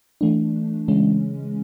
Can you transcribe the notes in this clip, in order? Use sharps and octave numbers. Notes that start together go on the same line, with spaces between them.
E3 A3 D4
C#3 E3 G#3 C#4